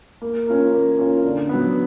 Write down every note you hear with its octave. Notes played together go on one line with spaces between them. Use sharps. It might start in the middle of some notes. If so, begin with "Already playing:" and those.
A#3
C#4 F4 A#4
A#3
C#4 F4 A#4
D3
F#3 B3